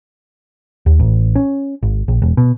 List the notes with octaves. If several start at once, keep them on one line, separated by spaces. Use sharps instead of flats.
D#2
A1
C#4
G#1
A#1
E1
B2